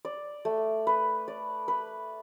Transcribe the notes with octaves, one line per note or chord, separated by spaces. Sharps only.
D5
A3
B4
D5
B4